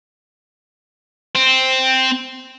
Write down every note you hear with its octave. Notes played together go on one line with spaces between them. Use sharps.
C4